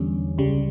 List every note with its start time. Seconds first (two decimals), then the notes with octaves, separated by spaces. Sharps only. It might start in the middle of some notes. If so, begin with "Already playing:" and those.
Already playing: E2 D3 G3 C#4
0.38 C#2 C#3 G3